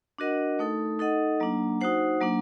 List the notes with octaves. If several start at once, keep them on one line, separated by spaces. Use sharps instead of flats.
D4 F#4 A#4 D#5 F#5
A3 D#4 A4
D#4 A4 D#5 F#5
F#3 A#3 D4
D#4 F#4 C5 F#5
F#3 A#3 D4